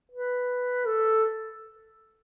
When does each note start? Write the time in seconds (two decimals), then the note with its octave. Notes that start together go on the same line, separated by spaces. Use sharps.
0.12 B4
0.86 A4